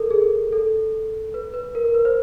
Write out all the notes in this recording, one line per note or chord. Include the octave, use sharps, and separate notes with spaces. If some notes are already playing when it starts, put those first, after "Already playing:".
Already playing: A4 A#4
G#4
A4
B4
B4
A#4
A#4
B4
C5